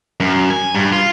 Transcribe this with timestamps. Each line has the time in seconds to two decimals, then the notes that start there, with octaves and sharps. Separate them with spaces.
0.20 F#2
0.50 G#5
0.75 G2
0.92 F4